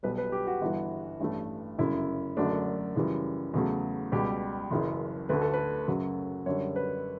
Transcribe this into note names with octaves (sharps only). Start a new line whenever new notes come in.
B1 B2 G3 B4
B4
G4
F#4
G1 G2 E3
A1 G2 E3 A3
G1 F#2 C#3 E4
F#1 F#2 D3 F#3 A3 D4
F#2 C#3 E3 G3
E2 C#3 F#3 A3
C#2 B2 G3 G4
F#1 F#2 C#3 E3
D2 D3 A3 B4
A4
B4
F#2 C#3 F#3
F#2 D3 G3 C#5
B4